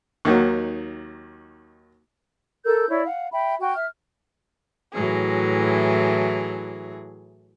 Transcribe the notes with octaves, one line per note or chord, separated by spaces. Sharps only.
D#2 D#3 F#3
A4 A#4 E6 G6
E4 C#5 D5
F5 F#5
E5 G5 B5
F#4 G5
E5 F6
A2 E3 F#3 G#4